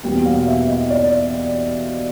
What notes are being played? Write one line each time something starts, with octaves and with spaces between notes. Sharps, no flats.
E2 B2 G3 A#3 G5
F5
E5
D#5
D5